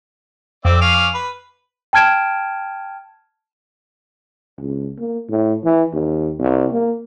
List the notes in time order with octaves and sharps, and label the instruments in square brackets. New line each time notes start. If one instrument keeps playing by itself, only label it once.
[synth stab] F2 [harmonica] C4 D5 E5
[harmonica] C#4 F5 D6
B4
[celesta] G5 A5 F6 G#6 D7 E7
[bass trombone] C#2
A#3
A2
E3
D#2
C2
A#3